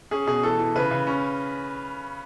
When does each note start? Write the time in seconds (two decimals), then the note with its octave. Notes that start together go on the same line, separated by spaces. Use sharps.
0.11 C#4 G#4
0.27 B2 G#4
0.43 E3 A4
0.59 E3
0.75 C#3 B4
0.91 C#3
1.07 C#4